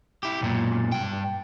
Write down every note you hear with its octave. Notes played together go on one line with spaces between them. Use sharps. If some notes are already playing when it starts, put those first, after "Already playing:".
E4 G4
B1 F#2 A#2
G2 G5